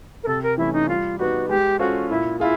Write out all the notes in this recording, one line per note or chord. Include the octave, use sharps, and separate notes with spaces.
A#4
C3 A4
A#4
E3 A3 C#4 E4
D#4
G3 F4
B3 D#4 F#4 G4 B4
G#3 G4
C#4 F4 F#4 A4 C5
A#2 E4
E4 F4 G#4